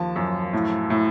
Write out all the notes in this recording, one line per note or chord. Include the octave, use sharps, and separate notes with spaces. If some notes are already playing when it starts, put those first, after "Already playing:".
Already playing: D#2 F3 A5
F#2
A2
A2